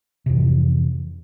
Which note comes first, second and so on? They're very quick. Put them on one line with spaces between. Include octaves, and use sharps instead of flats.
C3 F2 E3 G#2